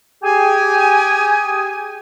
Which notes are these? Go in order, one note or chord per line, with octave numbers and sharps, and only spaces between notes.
G4 G#4 G#5